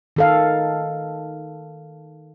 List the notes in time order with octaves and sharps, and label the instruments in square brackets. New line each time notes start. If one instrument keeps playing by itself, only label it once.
[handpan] D#3 A4 F5